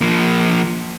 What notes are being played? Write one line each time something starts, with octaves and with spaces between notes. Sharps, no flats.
F3 A#3